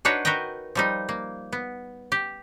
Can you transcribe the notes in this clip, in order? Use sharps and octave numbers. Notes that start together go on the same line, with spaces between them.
D4 D#4 F#4 B4 C#5 D#5
F#4 A#4 B4 D#5 G5
F3 G3 D#4
A#3
B3
G4